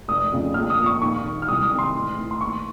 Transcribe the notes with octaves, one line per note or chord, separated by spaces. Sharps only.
F1 D#6
F2 C#3
A#1 F6
D#6
A#2
C#6
D#2 C#6
D#3
F6
C2 D#6
D#6
C3 D#3
C6
A1
A2
C6
D#2 C#6